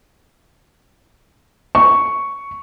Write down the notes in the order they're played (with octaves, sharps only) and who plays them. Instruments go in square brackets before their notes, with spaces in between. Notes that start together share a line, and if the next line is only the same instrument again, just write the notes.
[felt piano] C#6